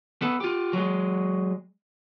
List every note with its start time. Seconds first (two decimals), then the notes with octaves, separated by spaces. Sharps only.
0.22 B3 A4
0.40 F4 G4
0.73 F#3 G#3